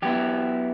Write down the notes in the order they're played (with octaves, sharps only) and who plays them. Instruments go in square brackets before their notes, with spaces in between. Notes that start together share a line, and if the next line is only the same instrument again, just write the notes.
[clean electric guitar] F#3 B3 E4 G4